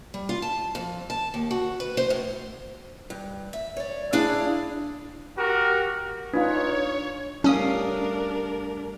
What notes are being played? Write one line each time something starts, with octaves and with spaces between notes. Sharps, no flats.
G3
F4
A5
F2
A5
D#2
F#4
B4
C5
A2
G2
E5
C#5 D5
D4 E4 G#4 D5 F5
F#4 G4 A#4
D4 D#4 F4 B4 C#5
G3 A3 C#4 D4 A#4 F5 D#6